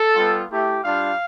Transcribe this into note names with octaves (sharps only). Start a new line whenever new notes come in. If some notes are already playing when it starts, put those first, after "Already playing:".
Already playing: A4
G3 B3 F4
A3 E4 G4
G3 D4 F4 F5